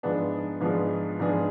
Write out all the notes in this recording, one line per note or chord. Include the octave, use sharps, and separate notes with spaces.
G#2 F3 B3 D4 G#4
G#2 F3 B3 D4 G#4
G#2 F3 B3 D4 G#4